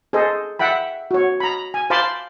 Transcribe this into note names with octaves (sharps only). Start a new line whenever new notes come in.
G#4 A4 C5 D#5
E5 F#5 G5 B5
F#4 C#5
A#5 B5
G#5
C5 F5 A5 B5 C6 D6